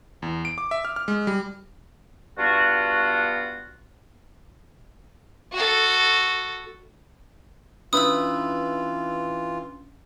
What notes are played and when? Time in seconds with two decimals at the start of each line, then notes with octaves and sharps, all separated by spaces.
0.22 E2
0.45 D7
0.58 D6
0.71 E5
0.85 F6
0.96 F6
1.08 G#3
1.27 G3
2.38 G2 B3 D4 F4 F#4
5.53 F#4 A4
7.93 E3 C#4 D4 E4 F4 B4 D#6 E6